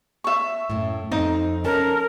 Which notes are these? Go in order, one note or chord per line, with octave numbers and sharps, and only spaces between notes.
E5 C#6
F#2 A2
F2 C4 D#4
C#4 A4 A#4